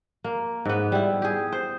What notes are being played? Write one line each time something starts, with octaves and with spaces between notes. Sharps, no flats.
A#3
G#2 B3
G3 E4
G4 G#4
C5